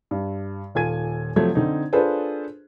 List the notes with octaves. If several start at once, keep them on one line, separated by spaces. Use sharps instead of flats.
G2
D#1 F4 A4 G#5 G#6 D#7
C3 F3 F#3 A3 G#6
D3 C4 D#4
D4 F4 G#4 A4 B4 C5